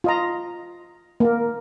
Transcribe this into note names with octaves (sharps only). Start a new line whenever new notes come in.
F4 D#5 A#5
A#3 A#4